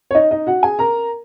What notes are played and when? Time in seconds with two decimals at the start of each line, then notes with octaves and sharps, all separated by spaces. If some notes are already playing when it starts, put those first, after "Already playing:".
0.11 C#5
0.15 D#4 D#5
0.31 D#4 D#5
0.47 F#4 F#5
0.63 G#4 G#5
0.79 A#4 A#5